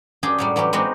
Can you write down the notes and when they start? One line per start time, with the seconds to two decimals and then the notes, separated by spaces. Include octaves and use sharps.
0.23 F#2 D4 G4 G#4 G5
0.38 A2 F#3 G3
0.56 E3 F#3 C#4 G4
0.73 G#3 B3 C4 D#4 F#4 G4